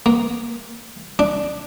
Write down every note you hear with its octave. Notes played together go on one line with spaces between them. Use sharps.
A#3
D4